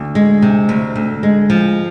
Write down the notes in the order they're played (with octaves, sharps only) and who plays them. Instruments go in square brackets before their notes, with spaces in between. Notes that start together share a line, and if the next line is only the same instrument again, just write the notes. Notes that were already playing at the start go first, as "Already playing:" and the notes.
Already playing: [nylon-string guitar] D2
G#3
C3
D2
D2
G#3
F3